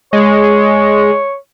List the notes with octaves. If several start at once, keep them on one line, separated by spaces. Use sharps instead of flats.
G#3 C#5